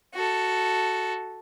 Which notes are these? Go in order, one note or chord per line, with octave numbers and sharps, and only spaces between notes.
F#4 A4